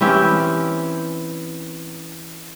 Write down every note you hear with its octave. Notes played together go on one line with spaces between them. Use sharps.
E3 C4 C#4 G4